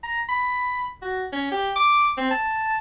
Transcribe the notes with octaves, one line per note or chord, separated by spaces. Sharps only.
A#5
B5
F#4
C#4
G4
D6
C4
A5